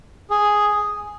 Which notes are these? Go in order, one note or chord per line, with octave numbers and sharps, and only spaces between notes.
G#4